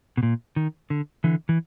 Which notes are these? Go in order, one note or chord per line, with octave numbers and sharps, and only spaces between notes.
B2
A#2
D#3
D3
D3 E3
E3